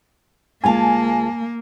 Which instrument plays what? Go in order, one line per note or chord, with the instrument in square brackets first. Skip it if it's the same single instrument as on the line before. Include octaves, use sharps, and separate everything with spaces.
[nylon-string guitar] D2 G#3 F4 [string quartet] A#3 [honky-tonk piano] G#5 A5